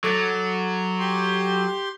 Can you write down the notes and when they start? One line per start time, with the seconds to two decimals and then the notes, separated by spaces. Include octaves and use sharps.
0.04 F#3 A4 D6 A6
0.99 G4 C6